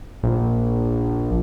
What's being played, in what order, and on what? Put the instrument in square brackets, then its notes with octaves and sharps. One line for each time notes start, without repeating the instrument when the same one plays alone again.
[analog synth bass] A#1